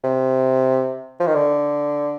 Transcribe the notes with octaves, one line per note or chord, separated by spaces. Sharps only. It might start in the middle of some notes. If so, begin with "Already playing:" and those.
C3
F3
D#3
D3